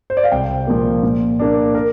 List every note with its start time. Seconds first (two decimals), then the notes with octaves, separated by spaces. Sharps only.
0.10 C5
0.17 D5
0.24 F5
0.32 C2 G5
0.67 A#2 F3 A#3
1.03 A#2
1.39 A#3 D4
1.75 A#4